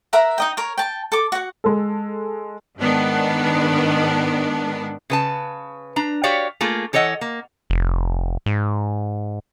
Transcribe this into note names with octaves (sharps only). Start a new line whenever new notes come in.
A#4 E5 F#5 A#5
D#4 D#5 G5
A#4 C#5
G5 A5
A4 D6
F#4 F#5
G#3 A4
G#2 D#3 B3 D4
C#3 B4 A5
D4 A#5
F#4 G4 C#5 D5 F5
A3 A#3 F4 G#4
E3 A4 C#5 D#5 F#5
A#3
F1
G#2